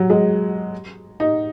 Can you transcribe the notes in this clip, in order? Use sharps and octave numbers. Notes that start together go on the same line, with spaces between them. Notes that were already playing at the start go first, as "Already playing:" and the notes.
Already playing: F#3
G#3
D#4